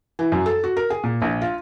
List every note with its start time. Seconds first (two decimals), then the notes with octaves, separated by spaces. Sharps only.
0.19 E3
0.32 F#2
0.46 A4
0.64 F#4
0.77 A#4
0.90 G#4
1.04 A#2
1.22 A#1
1.41 F4